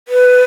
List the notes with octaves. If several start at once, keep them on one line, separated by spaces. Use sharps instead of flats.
B4